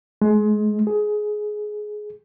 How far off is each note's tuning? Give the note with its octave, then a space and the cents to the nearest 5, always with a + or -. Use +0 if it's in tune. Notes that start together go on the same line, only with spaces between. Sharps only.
G#3 +25
G#4 +15